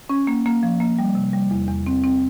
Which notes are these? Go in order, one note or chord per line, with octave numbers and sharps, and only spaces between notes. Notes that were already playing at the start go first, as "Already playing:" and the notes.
C#4
A#3
A#3
F3
A#3
G3
C3
G3
E2
E2
C4
C4